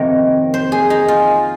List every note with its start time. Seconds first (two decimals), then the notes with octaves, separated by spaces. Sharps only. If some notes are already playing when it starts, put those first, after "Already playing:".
Already playing: F2 C3 D#3 A#3 C#5
0.54 C5
0.72 G#4
0.90 D#4
1.08 F4